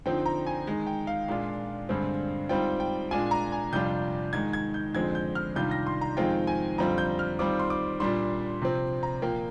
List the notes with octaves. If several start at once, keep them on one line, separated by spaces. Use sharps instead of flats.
D3 F3 C4 D#4 G5
A#5
G#5
D#3 G#3 D#4
G5
F5
A#2 G#3 D4 F4
G2 D3 G#3 C4
G#2 G3 C4 F4 G5
G5
A#2 G#3 D4 F4 G#5
A#5
G#5
F2 C3 G3 D4 F4 G6
G#2 D#3 G#3 G#6
G#6
G6
F2 D3 F3 G#3 C4 G#6
G6
F6
C3 D#3 G3 D4 F4 G6
A#6
C6
A#5
F2 D#3 G#3 C4 F4 G5
G#5
F2 D3 G3 C4 F4 A#5
G6
F6
D#3 G3 C4 F4 D6
C6
D6
A#2 G3 D4 C6
C3 F3 C4
A#5
A#2 F3 A#3 G5